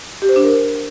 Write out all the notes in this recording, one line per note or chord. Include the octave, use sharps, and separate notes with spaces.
G4
C5
D4
A#4